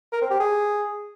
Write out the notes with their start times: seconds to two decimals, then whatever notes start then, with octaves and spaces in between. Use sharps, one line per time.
0.12 A#4
0.21 C4
0.31 G4
0.40 G#4